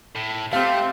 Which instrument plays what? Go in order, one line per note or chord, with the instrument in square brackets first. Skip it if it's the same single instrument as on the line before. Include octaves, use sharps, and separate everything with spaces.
[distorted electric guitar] A2
[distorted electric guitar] A3 [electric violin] C4 [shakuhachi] G4 [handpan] F5